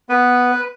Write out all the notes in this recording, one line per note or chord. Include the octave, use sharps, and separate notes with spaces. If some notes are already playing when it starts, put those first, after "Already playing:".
B3 B4